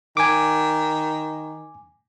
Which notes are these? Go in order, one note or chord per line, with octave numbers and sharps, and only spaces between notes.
D#3 G#5 D6